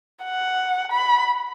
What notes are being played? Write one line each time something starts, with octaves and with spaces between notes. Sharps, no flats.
F#5
B5